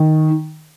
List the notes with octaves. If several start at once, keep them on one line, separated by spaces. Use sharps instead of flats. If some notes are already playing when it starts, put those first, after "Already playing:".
Already playing: D#3